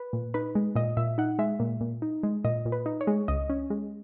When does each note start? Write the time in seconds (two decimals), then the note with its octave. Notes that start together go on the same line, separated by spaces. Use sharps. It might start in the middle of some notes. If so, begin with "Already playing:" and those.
Already playing: B4
0.13 A#2
0.34 D#4 B4
0.55 G#3
0.75 A#2 D#5
0.97 A#2 E5
1.18 D#4 F#5
1.39 G#3 E5
1.60 A#2
1.81 A#2
2.02 D#4
2.23 G#3
2.44 A#2 D#5
2.65 A#2
2.72 B4
2.86 D#4
3.01 C#5
3.07 G#3
3.28 C#2 D#5
3.50 C#4
3.70 G#3